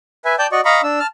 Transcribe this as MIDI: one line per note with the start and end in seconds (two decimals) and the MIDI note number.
0.25 0.36 71
0.25 0.36 76
0.25 0.36 80
0.39 0.47 74
0.39 0.47 79
0.39 0.47 81
0.39 0.47 91
0.52 0.61 66
0.52 0.61 74
0.52 0.61 75
0.52 0.61 85
0.65 0.81 75
0.65 0.81 77
0.65 0.81 82
0.65 0.81 83
0.65 0.81 85
0.83 0.99 62
0.83 0.99 88
1.00 1.07 81
1.00 1.07 89